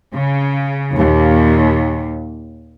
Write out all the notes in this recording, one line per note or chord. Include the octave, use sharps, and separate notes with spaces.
C#3
D#2 A#2